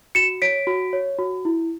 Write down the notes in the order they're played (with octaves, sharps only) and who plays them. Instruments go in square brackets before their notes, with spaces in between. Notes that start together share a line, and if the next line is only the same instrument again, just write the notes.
[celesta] F#4 C#7 E7
C#5 B6 D7
F#4
C#5
F#4
E4